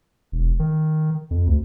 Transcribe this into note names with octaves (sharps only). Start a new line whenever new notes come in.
E1
D#3
F2
D2